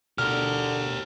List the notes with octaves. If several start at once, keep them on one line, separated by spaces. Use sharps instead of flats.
B2 D3 G4 A#4 F6